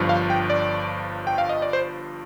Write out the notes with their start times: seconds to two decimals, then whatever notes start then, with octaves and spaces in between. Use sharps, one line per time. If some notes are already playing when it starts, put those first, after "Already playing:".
Already playing: G1 G2 F3
0.09 F5
0.30 G5
0.50 D5
1.27 G5
1.38 F5
1.49 D#5
1.62 D5
1.73 C5